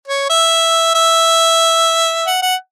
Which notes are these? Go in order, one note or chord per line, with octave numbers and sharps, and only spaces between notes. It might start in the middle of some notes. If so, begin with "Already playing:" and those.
C#5
E5
E5
F#5
F#5